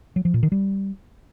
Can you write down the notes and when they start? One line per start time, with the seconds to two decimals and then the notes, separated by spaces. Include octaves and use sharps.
0.16 F#3
0.25 F3
0.34 A#2
0.43 D#3
0.52 G3